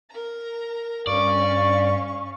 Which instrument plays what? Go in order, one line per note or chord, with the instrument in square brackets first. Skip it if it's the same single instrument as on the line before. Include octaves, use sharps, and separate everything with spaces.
[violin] A#4 A#5
[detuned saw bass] G2 [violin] C#4 F5 [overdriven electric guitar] D5 [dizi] C#6